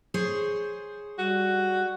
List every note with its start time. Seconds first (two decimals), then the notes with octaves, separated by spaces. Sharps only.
0.14 G#4 C5 C#5
1.18 G3 F#4